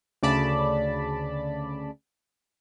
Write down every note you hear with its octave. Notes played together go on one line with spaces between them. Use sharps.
D2 C#3 D5 A5 B5